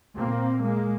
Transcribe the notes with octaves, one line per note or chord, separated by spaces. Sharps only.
A#2 A#3 C4
G#3 A#3